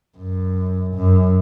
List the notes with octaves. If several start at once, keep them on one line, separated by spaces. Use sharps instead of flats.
F#2
F#2